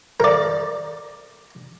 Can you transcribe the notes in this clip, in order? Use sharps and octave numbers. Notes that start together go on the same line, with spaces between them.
A#4 D5